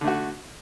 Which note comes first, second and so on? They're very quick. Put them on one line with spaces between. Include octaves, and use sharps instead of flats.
D3 A3 F#4